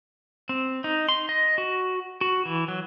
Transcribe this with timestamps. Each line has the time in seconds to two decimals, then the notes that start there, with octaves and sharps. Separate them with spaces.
0.49 C4
0.84 D#4
1.09 C6
1.29 D#5
1.58 F#4
2.21 F#4
2.45 E3
2.68 F#3